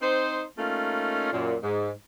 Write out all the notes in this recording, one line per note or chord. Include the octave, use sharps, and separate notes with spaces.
C4 D#4 C5
A3 A#3 C#4 D#4 F4
F#2 A#2
G#2